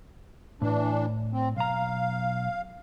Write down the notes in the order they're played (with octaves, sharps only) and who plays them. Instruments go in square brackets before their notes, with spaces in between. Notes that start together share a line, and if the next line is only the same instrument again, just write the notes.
[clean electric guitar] A2 [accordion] E3 D4
[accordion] C4
[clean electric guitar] B1 A#5 [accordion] F5